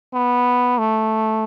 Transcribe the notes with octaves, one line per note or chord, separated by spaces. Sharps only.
B3
A3